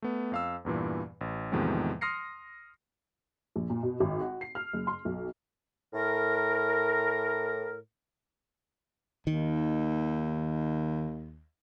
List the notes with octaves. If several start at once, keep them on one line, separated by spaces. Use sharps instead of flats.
A3 B3
F2 F5 E6
E2 G2 A#2 E3
A1
E2 A2 C3 D#3 F3 G#3
C6 D#6 F6 A#6 C7 C#7
A#1
A#2
B2
G#1
F#4
C7
F6
F#1
C6
B1
A2 A#4
D#2 D#3